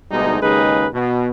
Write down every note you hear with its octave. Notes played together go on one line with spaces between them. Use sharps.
D2 B2 G3 G#3 D#4
D#2 C#3 G#3 D#4 G#4 B4
B2